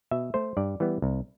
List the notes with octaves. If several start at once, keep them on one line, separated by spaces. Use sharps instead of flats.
B2 E5
A3 C5
G2 D5
E3 G3 B3
C2